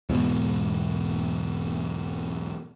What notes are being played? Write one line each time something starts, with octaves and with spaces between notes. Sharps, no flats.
E2 G#2 B2